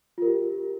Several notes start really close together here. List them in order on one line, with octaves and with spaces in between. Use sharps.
F4 A#4 G4